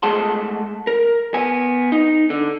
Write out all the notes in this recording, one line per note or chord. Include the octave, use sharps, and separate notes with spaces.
G#3 A3 G#4 F#5 A5 C6
A#4
B3 G#5
D#4
D3